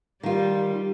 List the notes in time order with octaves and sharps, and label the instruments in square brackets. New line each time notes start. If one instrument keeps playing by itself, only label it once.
[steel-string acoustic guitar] D#3 F4 [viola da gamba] G3